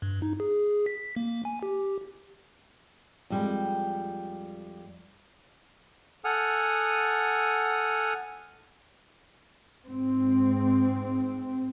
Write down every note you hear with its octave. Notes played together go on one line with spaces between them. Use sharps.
G2
D#4
G#4
B6
A#3
G#5
G4
F2 G3 G#3
A4 F#5 G#5 D#6 F6
G#2 C4